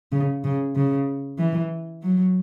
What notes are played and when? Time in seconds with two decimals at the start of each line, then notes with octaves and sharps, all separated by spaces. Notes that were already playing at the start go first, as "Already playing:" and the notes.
0.12 C#3
0.44 C#3
0.76 C#3
1.39 E3
2.03 F#3